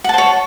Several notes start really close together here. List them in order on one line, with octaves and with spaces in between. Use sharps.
F#5 A5 C5 C#5